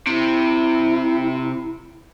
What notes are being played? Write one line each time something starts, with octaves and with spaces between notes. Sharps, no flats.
C3 E4